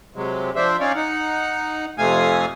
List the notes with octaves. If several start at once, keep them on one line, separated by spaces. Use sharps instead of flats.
C3 F#3 G#3
F3 D4 C5 E5
C#4 D#4 C#5 D5 F5
D#4 F#5
F2 C3 A3 F5 G#5 D#6